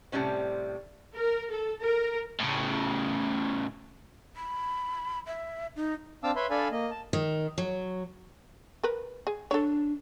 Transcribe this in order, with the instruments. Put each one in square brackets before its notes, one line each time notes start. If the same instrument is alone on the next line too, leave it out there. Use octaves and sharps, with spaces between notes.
[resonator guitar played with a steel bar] A2 C3 G3 C#4 C5
[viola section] A#4
A4
A#4
[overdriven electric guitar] A2 C#3
[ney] B5
E5
D#4
[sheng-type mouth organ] C4 D4 F5 A5 D6 E6
B4 C#5 E5 B5 C6
D4 A4 D5 F5 G#5 B5
A#3 D#5
A5
[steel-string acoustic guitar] D#3
F#3
[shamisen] A#4 B4
G#4
[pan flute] D4 [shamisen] A4 C#5